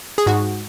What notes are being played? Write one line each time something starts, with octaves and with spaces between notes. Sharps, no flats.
G#4
G#2 F#4